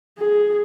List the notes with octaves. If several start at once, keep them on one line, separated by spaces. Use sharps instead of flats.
G#4